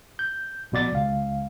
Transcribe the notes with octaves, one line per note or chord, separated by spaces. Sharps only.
G6
A#1 B2 D5 A6
C#2 F5